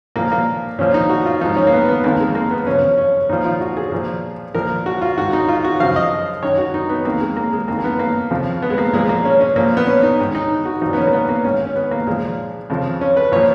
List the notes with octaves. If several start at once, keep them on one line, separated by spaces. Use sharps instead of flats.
A#2 F3 A#3
A#3
A#2 F3 C#4
D#4
F#4
F4
G#2 F3 D#4
C#4
A#3
B3
B3
F2 D#3 A#3
G#3
A#3
B3
F#2 C#3 F3 C#4
C#4
C#4
A#2 F3 D#4
F4
F#4
G#4
A#2 F3
A#2 F3 A#4
F#4
F4
G#2 D#3 F#4
D#4
F4
F#4
F#2 C#3 F3 F5
D#5
F#2 D#3 C#5
F#4
D#4
B3
F2 D#3 A#3
G#3
A#3
G#3
F2 D#3 A#3
A#3
B3
A#3
F2 C#3 F3
B3
G#3
A#3
A#2 F3 G#3
A#3
C#4
C#4
A#2 F3 A#3
B3
C#4
D#4
G#2 D#3
D#4
F#4
A#2 F3 D#4
B3
C#4
A#3
B3
A#3
G#2 D#3 C#4
C#4
B3
A#3
A#2 F3 G#3
F2 C#3 F3
C#4
B4
A#2 F3 C#5